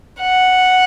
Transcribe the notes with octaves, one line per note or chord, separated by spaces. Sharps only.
F#5